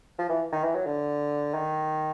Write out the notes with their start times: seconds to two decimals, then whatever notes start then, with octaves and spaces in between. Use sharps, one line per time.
0.18 F3
0.29 E3
0.52 D#3
0.64 E3
0.75 F#3
0.86 D3
1.54 D#3